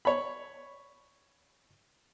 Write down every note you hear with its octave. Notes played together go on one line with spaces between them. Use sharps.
C#5 B5